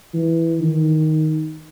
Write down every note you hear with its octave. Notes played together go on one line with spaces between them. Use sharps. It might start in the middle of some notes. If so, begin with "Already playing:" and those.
E3
D#3